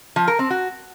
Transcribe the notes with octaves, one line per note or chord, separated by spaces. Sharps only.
F3
A#4
C4
F#4